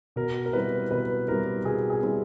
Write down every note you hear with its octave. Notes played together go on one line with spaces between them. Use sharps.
B2 A#4
A#4
G3 C4 E4 B4
B2 B4
G3 C4 E4 A#4
B2 G#4
G#4
G3 C4 E4